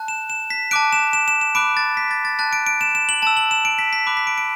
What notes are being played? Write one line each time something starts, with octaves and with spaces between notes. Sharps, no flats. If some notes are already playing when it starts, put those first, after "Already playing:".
Already playing: A5 F#6
E7
E7
B6
A5 D6 F#6 D7
E7
E7
E7
E7
B5 D6 F#6 D7
A6
B6
A6
A6
A5 F#6 A6
D7
D7
E7
E7
F#7
A5 E6 E7
F#7
E7
D7
B6
B6
B5 D6 F#6
B6
D7
D7